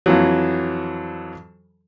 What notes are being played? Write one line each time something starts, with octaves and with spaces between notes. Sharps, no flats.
F2 E3 F#3